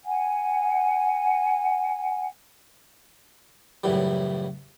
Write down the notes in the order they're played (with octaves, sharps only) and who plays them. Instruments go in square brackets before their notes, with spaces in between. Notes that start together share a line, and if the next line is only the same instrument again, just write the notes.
[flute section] F#5 G#5
[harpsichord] C#2 F#2 A2 E3 G3